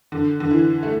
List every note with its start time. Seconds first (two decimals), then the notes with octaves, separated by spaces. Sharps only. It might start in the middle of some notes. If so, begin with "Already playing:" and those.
0.12 D3
0.40 D3
0.51 E3
0.83 A3